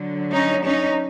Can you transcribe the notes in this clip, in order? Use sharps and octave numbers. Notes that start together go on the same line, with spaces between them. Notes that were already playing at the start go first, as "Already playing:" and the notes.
Already playing: D3 F#3
C#4 D#4
C#4 D#4